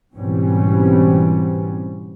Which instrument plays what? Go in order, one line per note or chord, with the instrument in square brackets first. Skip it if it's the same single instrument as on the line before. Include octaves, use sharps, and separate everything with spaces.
[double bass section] G#2 B2 E3 G3 C4 C#4